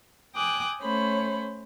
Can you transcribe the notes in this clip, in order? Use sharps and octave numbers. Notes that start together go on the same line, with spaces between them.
G5 G#5 D6 D#6 F#6
A3 C#4 C5 C#5 B5